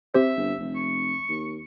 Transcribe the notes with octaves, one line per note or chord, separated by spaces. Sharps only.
C4 G4 C5 E5
G1
F1
C#6
D#2